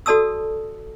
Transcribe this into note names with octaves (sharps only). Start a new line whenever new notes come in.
F#4 A4 D5 A5 D#6 E6